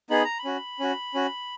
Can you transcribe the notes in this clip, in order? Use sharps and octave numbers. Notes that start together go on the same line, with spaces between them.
B3 D#4 G#4 B5
A#5
B5
C#4 F#4
C#4 F#4
C#4 F#4